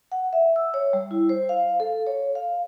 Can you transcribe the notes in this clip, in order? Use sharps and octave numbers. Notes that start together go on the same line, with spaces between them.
F#5
E5
E6
C#5
G3
E4
C5
F5
A4
C#5
F5